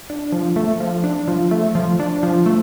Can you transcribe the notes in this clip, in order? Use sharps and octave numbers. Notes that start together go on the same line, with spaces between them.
D4
F3
A3
F3
D4
F3
A3
F3
D4
F3
A3